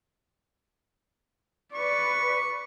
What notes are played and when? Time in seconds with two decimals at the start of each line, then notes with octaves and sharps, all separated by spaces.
1.74 B4 D5 C#6